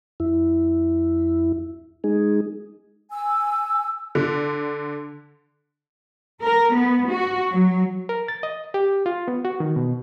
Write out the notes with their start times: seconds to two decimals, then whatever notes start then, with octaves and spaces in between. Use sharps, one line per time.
0.20 F2 E4
2.04 G#3 D#4 G#4
3.11 G#5 E6
4.15 D3
6.42 A#4
6.73 B3
7.13 F#4
7.51 F#3
8.09 A#4
8.28 A6
8.43 D#5
8.74 G4
9.06 F4
9.28 B3
9.45 F#4
9.60 D#3
9.76 B2